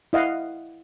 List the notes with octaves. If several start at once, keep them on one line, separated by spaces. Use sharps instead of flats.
E4 D#5 F5 F#5